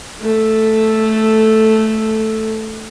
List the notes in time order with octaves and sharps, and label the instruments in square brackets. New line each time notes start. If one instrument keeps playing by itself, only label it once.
[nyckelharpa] A3 A4